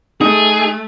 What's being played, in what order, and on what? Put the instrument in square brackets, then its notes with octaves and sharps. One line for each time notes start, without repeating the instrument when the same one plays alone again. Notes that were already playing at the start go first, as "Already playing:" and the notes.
[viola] A3 [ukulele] D#4 [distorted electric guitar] G#4